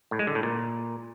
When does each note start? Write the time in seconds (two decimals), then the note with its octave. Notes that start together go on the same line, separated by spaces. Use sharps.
0.11 A2
0.19 G#3
0.27 D3
0.35 A2
0.43 A#2